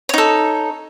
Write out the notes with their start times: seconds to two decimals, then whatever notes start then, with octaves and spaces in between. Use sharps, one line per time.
0.09 C#5
0.14 D#4
0.18 A4